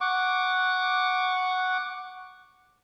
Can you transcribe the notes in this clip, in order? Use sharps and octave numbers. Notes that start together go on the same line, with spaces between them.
F#5 C#6 D6